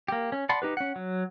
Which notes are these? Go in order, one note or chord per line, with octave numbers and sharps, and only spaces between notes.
A#3 G4
C#4
D5 F#5 A5 B5 C6
D#4 G4 B4
C#4 F#5
F#3